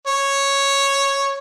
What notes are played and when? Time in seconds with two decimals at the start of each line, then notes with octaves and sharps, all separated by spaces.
0.07 C#5